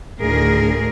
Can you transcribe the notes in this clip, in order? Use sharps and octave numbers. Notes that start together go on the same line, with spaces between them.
D2 A2 D#3 G#4 A#4